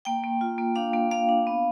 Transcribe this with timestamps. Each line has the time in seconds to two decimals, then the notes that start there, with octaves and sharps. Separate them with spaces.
0.05 A#3 G5
0.24 A#3
0.41 F4
0.58 A#3
0.76 D4 F5
0.93 A#3
1.11 A#3 F5
1.29 D4
1.47 B3